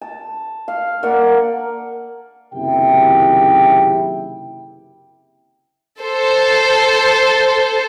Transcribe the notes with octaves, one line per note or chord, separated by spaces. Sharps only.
A5
F5
A#3 D5 F#5
F#1 C3 D#3 E4 G4 G5
A4 C5